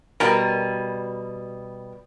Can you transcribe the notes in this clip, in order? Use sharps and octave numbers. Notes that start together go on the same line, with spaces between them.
B2 G3 A#4